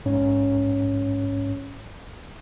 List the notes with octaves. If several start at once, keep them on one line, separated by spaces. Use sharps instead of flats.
A#1 G#2 C#4 C#5